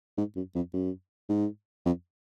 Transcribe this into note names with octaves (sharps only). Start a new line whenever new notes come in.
G#2
F#2
F2
F#2
G#2
F2